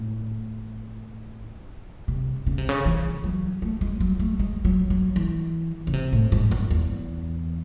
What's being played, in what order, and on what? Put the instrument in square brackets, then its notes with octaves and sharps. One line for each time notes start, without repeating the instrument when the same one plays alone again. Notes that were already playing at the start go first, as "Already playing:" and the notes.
Already playing: [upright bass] A2
C3
C#3
C3
C#3
E3
F#3
A3
G#3
F#3
A3
G#3
F#3
F#3
E3
C#3
C3
A2
G#2
F#2
E2